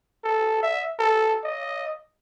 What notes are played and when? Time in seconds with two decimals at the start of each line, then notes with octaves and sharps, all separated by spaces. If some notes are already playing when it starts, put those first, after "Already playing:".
0.24 A4
0.63 E5
0.99 A4
1.44 D#5